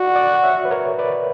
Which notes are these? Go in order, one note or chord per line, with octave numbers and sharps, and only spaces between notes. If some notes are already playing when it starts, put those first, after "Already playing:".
Already playing: F#4 D5 F#5
D5 F#5
F#5
C#5 E5
B4
A#4 C#5
B4 D5